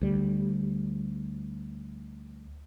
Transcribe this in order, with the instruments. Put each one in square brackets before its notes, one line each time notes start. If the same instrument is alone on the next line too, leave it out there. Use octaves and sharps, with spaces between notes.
[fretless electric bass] D2 G3